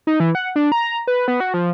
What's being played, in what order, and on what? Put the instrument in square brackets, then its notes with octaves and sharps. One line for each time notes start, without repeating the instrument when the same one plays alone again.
[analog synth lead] D#4
E3
F#5
D4
A#5
B4
B3
F#4
F3